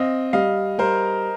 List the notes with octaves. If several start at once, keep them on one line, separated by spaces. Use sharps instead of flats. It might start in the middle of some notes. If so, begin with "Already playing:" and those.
Already playing: C4 D#5 F5
G3 D#5 F5
G3 A#4 C5